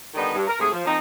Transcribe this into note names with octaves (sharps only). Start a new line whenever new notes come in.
D3 D#3 G3 B3 D4 D#4
G2
A#4
G#2 C3 A3 G#4
F3
F3 A#3 C4 D#4